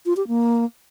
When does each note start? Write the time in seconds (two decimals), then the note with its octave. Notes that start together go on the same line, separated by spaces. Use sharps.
0.06 F4
0.17 G4
0.28 A#3